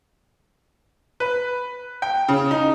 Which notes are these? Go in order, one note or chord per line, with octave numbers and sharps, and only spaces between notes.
B4
G5
C#3
D#4